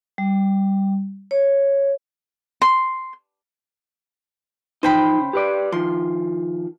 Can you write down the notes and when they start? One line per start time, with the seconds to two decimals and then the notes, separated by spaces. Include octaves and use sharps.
0.18 G3
1.31 C#5
2.62 C6
4.83 F3 D#4 C5 G5 B5
5.20 C#3
5.33 G4 B4 D5
5.72 D#3 F3 C6